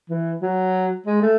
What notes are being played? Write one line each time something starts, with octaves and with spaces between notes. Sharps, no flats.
E3
F#3
G#3
A3